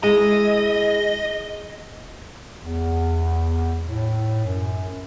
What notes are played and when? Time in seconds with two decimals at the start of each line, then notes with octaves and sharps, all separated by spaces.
0.03 G#3 E4 D#5
2.63 E2
3.88 A2
4.45 F#2